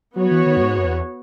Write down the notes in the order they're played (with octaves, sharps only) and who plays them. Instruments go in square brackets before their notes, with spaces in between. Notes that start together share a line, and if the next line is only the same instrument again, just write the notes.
[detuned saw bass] F#3 [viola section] B3 F#4 C#5
[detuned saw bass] E3
D#3
F#2
G#2
F#2
E2